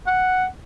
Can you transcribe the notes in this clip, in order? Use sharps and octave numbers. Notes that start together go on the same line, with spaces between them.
F#5